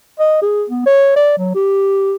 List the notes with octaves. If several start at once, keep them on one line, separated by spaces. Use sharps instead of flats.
D#5
G#4
B3
C#5
D5
F#3
G4